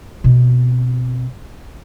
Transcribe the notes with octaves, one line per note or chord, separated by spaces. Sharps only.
B2 C4